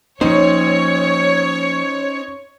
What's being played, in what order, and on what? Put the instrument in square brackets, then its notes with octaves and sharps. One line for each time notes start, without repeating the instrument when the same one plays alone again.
[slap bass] F3 A#3 [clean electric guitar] C#4 C5 [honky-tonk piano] D#4 [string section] C#5